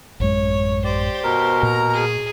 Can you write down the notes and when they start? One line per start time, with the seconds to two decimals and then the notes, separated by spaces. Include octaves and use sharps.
0.20 A1 F#2 G#3 C#5
0.84 G4 C5 D5
1.23 B2 A#4
1.63 A#2 A#5
1.94 G#4